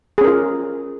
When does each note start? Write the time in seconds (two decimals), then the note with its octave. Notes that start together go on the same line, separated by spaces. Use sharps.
0.18 G#4
0.21 C#4
0.24 A#4
0.27 F4